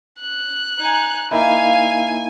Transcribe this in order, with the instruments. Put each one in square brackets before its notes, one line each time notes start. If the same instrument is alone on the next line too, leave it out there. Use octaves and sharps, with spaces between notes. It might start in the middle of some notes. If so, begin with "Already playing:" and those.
[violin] F#6
[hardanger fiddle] D#4 G#5
[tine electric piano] A#3 D#4 E4 [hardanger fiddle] F5 [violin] G#5